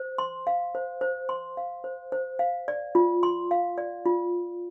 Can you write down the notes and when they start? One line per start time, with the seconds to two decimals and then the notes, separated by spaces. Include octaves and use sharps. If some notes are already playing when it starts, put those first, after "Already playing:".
Already playing: C5
0.18 C6
0.47 F5
0.75 C5
1.01 C5
1.29 C6
1.57 F5
1.84 C5
2.12 C5
2.39 F5
2.68 D5
2.95 F4
3.23 C6
3.51 F5
3.78 D5
4.06 F4